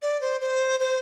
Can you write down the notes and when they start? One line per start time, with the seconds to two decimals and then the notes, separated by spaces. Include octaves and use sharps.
0.02 D5
0.21 C5
0.41 C5
0.80 C5